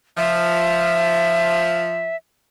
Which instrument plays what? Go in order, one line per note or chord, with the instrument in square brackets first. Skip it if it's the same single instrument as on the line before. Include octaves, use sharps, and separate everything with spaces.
[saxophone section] F3 [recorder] E5